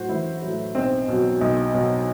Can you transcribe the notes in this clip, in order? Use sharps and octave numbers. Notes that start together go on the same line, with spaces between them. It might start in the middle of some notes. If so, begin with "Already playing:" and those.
Already playing: A2 F#3 F#4 C5
A1 E4
A2 F#3
B1 C4
B2 F#3
B1
B2 F#3